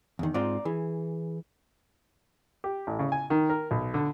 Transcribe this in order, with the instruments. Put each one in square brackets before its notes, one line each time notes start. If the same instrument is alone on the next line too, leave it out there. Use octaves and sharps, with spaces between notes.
[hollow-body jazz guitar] E2 D#3
[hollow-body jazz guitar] G#2 C4 F4 [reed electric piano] D5 A#5 D6
[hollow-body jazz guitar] E3 [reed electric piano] G#4
[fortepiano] G4
A1
C#3
G#5
D#3
A#4
B1
D3